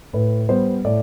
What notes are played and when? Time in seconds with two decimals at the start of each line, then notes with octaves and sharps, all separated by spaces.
0.13 A2 B4
0.49 G3 B3 C5
0.85 A2 D5